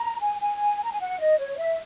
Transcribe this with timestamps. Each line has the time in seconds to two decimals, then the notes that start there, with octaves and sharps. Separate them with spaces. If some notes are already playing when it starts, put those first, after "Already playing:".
Already playing: A#5
0.21 G#5
0.40 G#5
0.84 A#5
0.92 G#5
1.00 F#5
1.19 D#5
1.39 C#5
1.58 E5